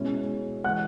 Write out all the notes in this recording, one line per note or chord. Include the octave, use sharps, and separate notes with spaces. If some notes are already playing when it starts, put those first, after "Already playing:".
Already playing: B2 G#3 C#4 E4
E3 G#3 F#5 F#6